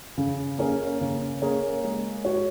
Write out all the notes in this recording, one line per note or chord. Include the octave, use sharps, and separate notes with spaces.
C#3
A#3 C#4 G#4 C#5
C#3
A#3 C#4 G#4 C#5
G#3
F#4 C#5